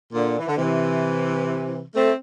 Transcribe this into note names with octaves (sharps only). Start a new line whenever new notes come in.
A#2 D3
E3
D3
C3 E3
A3 C4